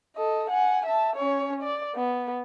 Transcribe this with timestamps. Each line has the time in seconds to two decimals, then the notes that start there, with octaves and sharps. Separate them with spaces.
0.16 A4 D#5
0.50 F#5 G#5
0.86 E5 A5
1.16 C#4 C#5
1.63 D5
1.95 B3